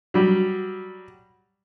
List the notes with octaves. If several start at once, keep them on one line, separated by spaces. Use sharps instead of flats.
F#3 G3